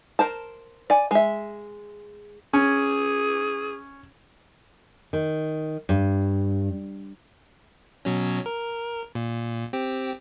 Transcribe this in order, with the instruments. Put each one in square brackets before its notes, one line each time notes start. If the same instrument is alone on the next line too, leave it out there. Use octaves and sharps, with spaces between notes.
[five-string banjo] A#4 C5 A5
D5 G#5
G#3 E5
[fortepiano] C#4 [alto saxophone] G#4
[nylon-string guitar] D#3
G2
[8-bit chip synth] B2 F#3 C#4
A#4
A#2
C4 G4